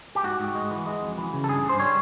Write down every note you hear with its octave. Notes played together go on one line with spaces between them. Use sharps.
G4
G#2 F#4
G#2
G#3
E3
G#3
F2
E3
C#3
A4
G2 G#4
G2 C5
G3 C#5